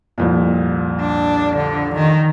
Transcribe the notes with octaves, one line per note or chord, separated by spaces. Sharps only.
C2 F2 A#2
D4
D3
D#3